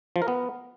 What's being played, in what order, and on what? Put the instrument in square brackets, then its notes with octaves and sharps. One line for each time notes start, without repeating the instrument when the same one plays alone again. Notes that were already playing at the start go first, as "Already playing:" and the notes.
[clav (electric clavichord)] F3
A#4
B3